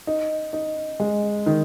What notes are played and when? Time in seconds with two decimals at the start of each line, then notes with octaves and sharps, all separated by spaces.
0.07 D#4
0.53 D#4
1.00 G#3
1.46 D#3